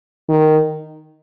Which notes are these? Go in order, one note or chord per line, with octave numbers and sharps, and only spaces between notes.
D#3